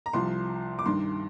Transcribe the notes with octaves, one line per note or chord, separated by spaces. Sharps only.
A#5
C2 C3 F3 C6
D6
G2 D#3 C6